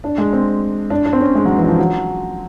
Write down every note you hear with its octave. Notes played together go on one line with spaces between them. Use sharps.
D4
G#3
C4
D4
D4
C4
C#4
G#3
F#3
E3
F#3
F3
F#3